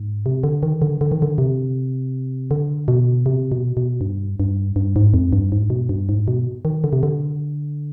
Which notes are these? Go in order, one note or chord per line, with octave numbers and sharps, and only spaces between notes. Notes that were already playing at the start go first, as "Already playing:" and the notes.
Already playing: G#2
C3
D3
D#3
D3
D3
D#3
D3
C3
D3
B2
C3
B2
B2
G2
G2
G2
G#2
F2
G2
G#2
B2
G2
G#2
B2
D#3
D3
C3
D3